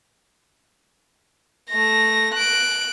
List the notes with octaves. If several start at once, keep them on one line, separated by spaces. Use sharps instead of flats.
A3 A#6
F#6 D7